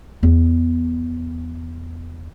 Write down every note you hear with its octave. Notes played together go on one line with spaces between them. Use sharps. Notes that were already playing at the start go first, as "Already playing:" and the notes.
E2 B3